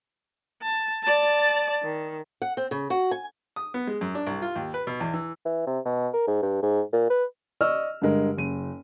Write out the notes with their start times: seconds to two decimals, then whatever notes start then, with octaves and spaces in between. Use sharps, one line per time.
0.62 A5
1.03 D5 A5
1.83 D#3
2.42 F#5
2.57 C4
2.71 C#3
2.90 F#4
3.11 G#5
3.56 D#6
3.74 B3
3.87 G#3
4.01 F#2
4.15 D4
4.27 C2
4.42 F4
4.56 D#2
4.74 B4
4.87 B2
5.00 E2
5.14 E3
5.46 E3
5.67 C3
5.85 B2
6.14 A#4
6.27 G#2
6.43 G2
6.63 G#2
6.93 A#2
7.10 B4
7.61 D5 D#5 C#6 E6 F6
8.02 G2 D3 G#3 A#4
8.37 F#1 D#7